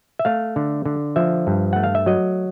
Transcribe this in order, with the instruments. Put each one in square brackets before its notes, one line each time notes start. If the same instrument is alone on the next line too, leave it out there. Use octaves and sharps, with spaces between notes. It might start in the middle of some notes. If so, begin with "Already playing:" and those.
[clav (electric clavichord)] E5
A3 F5
D3
D3
F3 E5
G2
A3 F#5
F5
E5
F#3 D#5